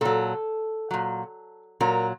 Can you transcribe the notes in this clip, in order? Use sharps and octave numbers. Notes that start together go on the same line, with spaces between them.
A#2 F#3 A4
A#2 F#3
A#2 F#3 A#4